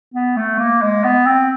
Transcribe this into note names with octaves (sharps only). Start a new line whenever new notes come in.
B3
A3
A#3
G#3
B3
C4